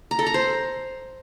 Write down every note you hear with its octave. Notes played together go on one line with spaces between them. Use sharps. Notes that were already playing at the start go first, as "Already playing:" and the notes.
A#5
A4
A#5
C5